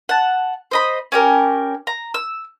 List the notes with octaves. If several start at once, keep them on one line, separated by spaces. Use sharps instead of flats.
F#5 A5
C5 D#5 B5
C#4 G4 A#4
A#5
E6